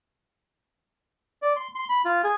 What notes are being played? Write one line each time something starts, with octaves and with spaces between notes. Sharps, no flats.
D5
C6
C6
B5
F4
G#4